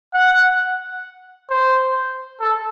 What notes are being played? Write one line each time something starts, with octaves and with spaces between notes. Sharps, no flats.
F#5
C5
A4